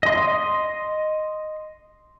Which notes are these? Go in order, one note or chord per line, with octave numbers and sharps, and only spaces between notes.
D#5 C6